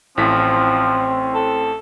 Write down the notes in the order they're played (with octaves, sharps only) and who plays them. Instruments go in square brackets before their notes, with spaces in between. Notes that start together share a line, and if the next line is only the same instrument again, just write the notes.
[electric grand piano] A1 A2 B6 [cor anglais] F3 [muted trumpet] C4
[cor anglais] A4